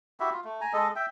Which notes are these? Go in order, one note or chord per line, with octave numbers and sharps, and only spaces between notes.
E4 F#4 G4 E5
F4
A3
G#5 A#5
G#3 A4 D#5
E5 G5